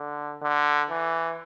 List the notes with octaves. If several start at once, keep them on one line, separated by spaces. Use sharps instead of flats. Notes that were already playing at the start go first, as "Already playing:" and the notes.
Already playing: D3
D3
E3